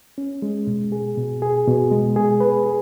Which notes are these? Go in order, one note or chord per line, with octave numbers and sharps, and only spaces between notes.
C#4
G#3
B2
G#4
B2
G#4
B2
G#3
G#4
B4
G#4